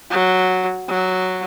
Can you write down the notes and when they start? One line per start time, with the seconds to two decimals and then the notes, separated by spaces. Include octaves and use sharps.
0.10 F#3
0.89 F#3